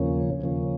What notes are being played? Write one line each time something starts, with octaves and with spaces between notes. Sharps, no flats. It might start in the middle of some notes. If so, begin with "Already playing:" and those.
Already playing: D#2 C#3 F3 A#3 C#4
D#2 C#3 F3 A#3 C#4